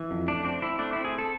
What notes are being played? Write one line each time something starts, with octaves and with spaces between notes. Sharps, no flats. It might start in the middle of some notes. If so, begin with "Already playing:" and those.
Already playing: E3
F2
A3 D4
C4 D4
C4 E4
A3 D4
C4 E4
G#4
A4